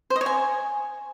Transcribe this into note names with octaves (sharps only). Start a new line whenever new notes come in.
C5
D#5
C#5
G#5